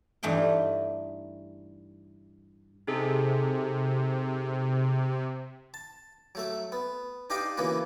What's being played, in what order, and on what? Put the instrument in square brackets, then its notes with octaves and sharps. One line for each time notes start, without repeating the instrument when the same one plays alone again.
[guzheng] G2 E3 A3 D#4 G5
[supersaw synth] C3 [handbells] D#4 G#4 A4
[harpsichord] A5
F#3 A3 E5
B3
D4 D#4 G4 D#5 F5 D6
C#3 E3 A#3 B3 F#4